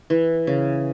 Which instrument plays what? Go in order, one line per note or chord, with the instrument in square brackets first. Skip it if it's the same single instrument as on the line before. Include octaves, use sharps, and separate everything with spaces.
[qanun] E3
C#3